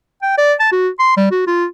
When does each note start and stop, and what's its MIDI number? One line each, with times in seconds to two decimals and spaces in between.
0.22 0.34 79
0.38 0.53 74
0.60 0.71 81
0.72 0.89 66
0.99 1.15 84
1.17 1.27 55
1.31 1.45 66
1.47 1.65 65